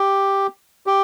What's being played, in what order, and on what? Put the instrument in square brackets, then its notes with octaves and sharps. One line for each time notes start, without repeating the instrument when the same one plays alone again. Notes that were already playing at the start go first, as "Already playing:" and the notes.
Already playing: [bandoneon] G4
G4